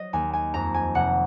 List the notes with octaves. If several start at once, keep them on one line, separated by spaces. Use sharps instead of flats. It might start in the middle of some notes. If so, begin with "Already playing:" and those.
Already playing: F#3 D#5
D#2 G#5
G#5
F2 A#5
G#5
F1 F#5